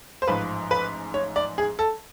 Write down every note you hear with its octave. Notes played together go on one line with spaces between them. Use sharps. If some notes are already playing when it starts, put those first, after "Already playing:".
C5
A1 G#2 F3 B4
B4
C#5
D5
G#4
A4